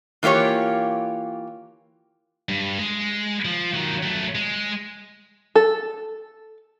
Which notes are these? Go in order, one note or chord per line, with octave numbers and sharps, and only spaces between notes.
E3 A#3 F4 G4 C#5
G2
G#3
F3
D#3 F#3
F#3 A3
G#3
A4